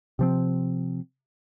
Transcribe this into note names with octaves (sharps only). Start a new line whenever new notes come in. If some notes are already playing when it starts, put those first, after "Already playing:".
C3 F3 C4